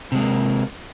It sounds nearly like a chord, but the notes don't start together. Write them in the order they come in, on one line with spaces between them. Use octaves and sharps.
C3 G#3 A#3